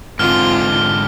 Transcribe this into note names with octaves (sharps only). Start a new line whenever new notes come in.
G#2 D3 C4 F4 F6 G7